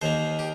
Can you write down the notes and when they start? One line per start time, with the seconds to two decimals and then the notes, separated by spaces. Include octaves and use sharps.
0.02 D#2 D#3 A#3 C5
0.39 G4